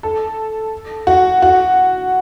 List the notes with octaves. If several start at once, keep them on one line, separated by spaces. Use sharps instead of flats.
A4
F#4
F#4